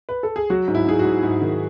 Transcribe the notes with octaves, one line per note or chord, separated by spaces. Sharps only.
B4
A4
G#4
F#3 F#4
G#2
E4
G#2 G#4
F#4
G#2
G#2
D#3